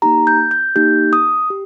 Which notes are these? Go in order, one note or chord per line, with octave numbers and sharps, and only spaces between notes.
A#3 D#4 G4 A#5
G6
G6
A#3 D#4 G4 G6
D#6
G4